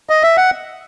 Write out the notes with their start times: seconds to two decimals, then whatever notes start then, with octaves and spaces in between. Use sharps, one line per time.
0.10 D#5
0.23 E5
0.37 F#5